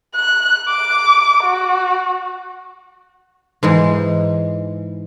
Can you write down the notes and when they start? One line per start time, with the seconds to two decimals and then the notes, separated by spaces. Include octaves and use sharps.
0.15 F#6
0.69 D6
1.44 F#4
3.63 G#2 E3 G#3